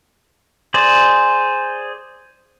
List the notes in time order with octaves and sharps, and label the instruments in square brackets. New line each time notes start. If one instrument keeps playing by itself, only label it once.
[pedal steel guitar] G#4 C5 D5